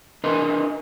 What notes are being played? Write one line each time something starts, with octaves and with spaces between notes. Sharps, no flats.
D4 A#4 B4 D#5 G#5 C6